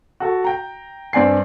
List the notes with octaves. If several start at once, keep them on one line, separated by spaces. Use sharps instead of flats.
F#4 A4
G5 A#5
G2 C4 D5 G#5 C7